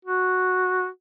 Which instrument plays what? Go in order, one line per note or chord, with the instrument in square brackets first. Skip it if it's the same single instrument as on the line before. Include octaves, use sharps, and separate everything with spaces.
[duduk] F#4